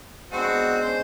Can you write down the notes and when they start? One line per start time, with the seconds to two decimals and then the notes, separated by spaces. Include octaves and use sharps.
0.32 G#3 B3 C4 D4 F#4
0.82 C#4 C5 D#5 G#5